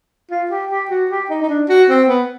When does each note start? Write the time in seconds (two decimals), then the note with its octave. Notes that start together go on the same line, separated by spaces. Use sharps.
0.31 F4
0.51 G4
0.70 G4
0.90 F#4
1.10 G4
1.30 D#4
1.42 D#4
1.49 D4
1.69 F#4
1.89 C4
2.08 B3